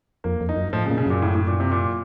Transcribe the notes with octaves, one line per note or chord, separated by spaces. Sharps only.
F2 A#3
F2
D#4
F#2
A2 F3
C#3
A#2
C#3
F#2 A#2
A2
A2
A#2
C3
A#2